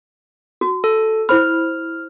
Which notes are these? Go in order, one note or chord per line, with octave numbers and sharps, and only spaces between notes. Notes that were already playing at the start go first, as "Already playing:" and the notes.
F#4
A4
E4 C5 B5 F6